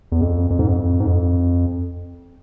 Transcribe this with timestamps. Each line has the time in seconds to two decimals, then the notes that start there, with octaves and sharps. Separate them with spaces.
0.12 E2
0.21 F2
0.50 F2
0.59 G#2
0.68 F2
1.00 G#2
1.06 F2